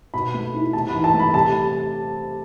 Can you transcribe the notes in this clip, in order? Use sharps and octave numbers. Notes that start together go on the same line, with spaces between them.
B2 B5
A3
E4
C3 A5
B5
E3
A5
A3
B5
C3 A5